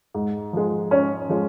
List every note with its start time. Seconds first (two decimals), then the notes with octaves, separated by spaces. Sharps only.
0.14 G#2
0.53 F3 G#3
0.91 G#2 C#4 C#5
1.29 F3 G#3